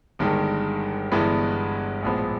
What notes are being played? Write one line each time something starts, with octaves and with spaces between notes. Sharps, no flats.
G1 G2 D#3 G#3
G1 G2 E3 G#3 B3
A#1 A2 F3 G#3 B3